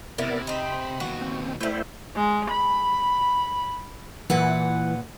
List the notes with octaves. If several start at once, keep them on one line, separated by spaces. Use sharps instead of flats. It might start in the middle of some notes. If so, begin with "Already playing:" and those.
C3 B3 E4 A#4 D5
C4 D#4 B5
D#2 B2 F#4
C4
G3 A3 B3 E4 C5
G#3
B5
A#2 E3 B4 F#5